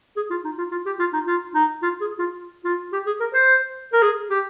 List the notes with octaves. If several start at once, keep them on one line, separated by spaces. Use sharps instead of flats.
G#4
F4
D#4
F4
F4
G4
F4
D#4
F4
D#4
F4
G#4
F4
F4
G4
G#4
A#4
C5
A#4
G#4
G4